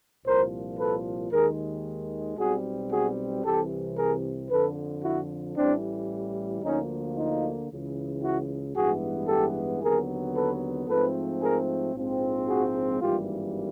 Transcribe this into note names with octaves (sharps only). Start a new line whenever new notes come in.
C2 A#2 F3 A#4 C5
A4 B4
D#2 D#3 G#3 G#4 A#4
B1 B2 G3 C4 F#4 G#4
F#4 G#4
C2 C3 E3 G4 A4
G#4 A#4
F2 D3 F3 A4 B4
E4 F#4
A1 A2 E3 G3 C4 D4
D2 D3 F3 A#3 C#4 D#4
D#4 F4
C#2 C#3 E3
E4 F#4
A1 G2 E3 G#3 B3 F#4 G#4
G4 A4
D#2 D3 F#3 B3 G#4 A#4
A4 B4
G#2 F3 A3 C4 A4 B4
G#4 A#4
A#1 G#2 F3 G#3 C4
F#4 G#4
G#1 G2 E3 G3 A#3 F4 G4